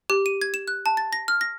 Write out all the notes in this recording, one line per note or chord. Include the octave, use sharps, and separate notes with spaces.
G4
D#7
G#6
E7
F#6
A5
A6
A#6
F6
A#6